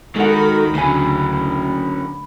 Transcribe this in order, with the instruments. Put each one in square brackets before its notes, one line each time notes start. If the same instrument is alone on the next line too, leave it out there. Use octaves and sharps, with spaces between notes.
[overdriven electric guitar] D#3 [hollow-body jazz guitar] G#3 F#5 [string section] F#4 B5 [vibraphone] A4
[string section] D2 [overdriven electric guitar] C#3 F#3 [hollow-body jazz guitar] A3 G#5 [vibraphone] B5